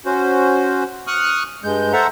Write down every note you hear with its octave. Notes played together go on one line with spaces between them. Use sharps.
C#4 F#4 C5
C#6 D#6 F6 F#6
G2 G#3 G6
A4 C5 E5 F#5 A#5